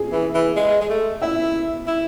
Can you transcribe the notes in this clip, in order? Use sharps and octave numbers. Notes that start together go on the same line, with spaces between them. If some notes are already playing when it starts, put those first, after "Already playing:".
Already playing: G#4
E3
E3
G#3
G#3
A3
E4 E5
E4